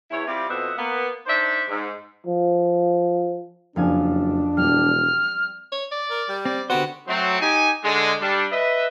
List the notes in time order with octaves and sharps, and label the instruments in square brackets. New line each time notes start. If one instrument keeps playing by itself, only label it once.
[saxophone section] E2 E4 C#5
G3 C4 E4 F4 G4 D5
F2 B2 C4 D#5 E5 F#5
A#3 B3
D4 D#4 C5 D5 E5
G#2
[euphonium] F3
[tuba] F#1 [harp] F2 F5 G#5 [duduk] D4
[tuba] E1 [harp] G3 [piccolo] F6
[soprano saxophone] C#5
D5
[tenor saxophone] A#4
G3
[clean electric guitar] C4 [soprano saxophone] D5
[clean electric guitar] D3 G4 C5 [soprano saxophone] B3 [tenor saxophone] F#4
[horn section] F#3 A3 C4
D#4 G4 G#5
D3 G#3
G3 D4
B4 D#5 E5